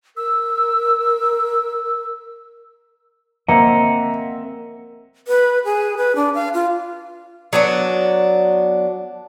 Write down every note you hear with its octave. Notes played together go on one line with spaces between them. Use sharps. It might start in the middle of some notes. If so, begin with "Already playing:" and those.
A#4 E6
A#3 C4 D#5 E5 F#5 A#5
B4
G#4
B4
D4
F5
F4
F#3 B3 D4 F#4